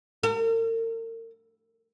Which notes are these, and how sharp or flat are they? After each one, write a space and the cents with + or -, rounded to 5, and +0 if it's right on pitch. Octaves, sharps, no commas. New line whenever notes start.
A#4 -40